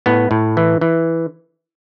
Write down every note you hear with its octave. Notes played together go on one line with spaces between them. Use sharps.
A2 B3
A2
E3
E3